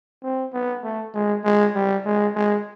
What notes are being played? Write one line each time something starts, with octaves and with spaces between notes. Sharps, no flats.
C4
B3
A3
G#3
G#3
G3
G#3
G#3